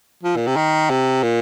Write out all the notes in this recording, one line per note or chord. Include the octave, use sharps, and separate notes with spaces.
F3
A#2
C3
D#3
C3
A#2